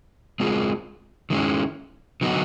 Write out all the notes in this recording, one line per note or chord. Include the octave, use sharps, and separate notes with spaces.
G#3 C4 F4 G#4
D#3 G#3 C#4 E4
D3 F#3 B3 D#4